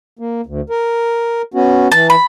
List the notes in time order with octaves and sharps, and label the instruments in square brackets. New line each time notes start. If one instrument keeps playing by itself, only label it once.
[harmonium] A#3
D2
A#4
B3 C#4 F#4
[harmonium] E3 [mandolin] A5
[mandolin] B5